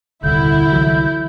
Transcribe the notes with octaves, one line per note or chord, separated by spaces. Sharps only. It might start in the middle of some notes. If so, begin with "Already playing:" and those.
D#1 C2 D3 E4 G6
C2 E3 F#3